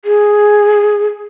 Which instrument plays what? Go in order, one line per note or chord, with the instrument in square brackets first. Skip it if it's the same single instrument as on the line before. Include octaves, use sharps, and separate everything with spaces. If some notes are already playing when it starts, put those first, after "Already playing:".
[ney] G#4